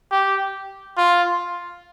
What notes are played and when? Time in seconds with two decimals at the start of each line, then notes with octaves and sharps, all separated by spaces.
0.11 G4
0.98 F4